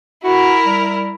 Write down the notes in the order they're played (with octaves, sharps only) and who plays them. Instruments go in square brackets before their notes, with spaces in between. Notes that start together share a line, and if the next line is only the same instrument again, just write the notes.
[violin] E4 A#4 [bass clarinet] F#4
[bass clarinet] G3